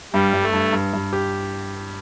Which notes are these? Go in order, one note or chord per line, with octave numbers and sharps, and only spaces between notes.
G2 G3
G2
A3
G2
G2
G2
G4